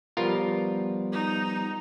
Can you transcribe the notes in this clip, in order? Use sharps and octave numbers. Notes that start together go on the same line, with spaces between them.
F3 G3 B3 F4 A#4
D#4